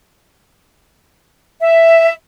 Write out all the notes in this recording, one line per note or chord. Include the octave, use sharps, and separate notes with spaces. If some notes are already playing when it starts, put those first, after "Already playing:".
E5